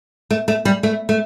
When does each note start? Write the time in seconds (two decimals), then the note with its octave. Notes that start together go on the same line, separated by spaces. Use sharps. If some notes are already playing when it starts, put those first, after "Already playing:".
0.31 A3
0.48 A3
0.65 G3
0.83 A3
1.09 A3